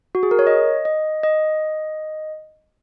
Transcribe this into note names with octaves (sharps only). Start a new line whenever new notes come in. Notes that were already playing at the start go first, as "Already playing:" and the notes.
F#4
G#4
A#4
C#5
D#5
D#5
D#5